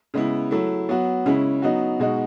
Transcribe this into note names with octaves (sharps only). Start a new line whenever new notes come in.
C#3 G#3 B3 E4
F#3 A3 E4
F#3 B3 F#4
C#3 G#3 C#4 E4
F#3 B3 D#4 F#4
B2 G#3 D#4 F#4